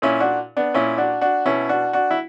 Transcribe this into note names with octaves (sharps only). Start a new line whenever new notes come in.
A#2 C#4 E4
D4 F#4
B3 D4
A#2 C#4 E4
D4 F#4
D4 F#4
B2 C#4 E4
D4 F#4
D4 F#4
E4